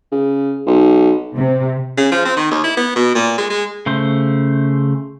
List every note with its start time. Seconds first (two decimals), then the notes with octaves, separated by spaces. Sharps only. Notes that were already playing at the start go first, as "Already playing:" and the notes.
0.12 C#3
0.67 B1
1.34 C3
1.98 C#3
2.12 F3
2.25 C4
2.37 D#3
2.51 D#2
2.64 E4
2.77 B3
2.96 B2
3.15 A#2
3.38 G#3
3.50 G#3
3.86 C#3 A3 C5